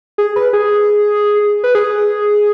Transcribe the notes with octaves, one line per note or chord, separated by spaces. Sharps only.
G#4
B4
G#4
B4
G#4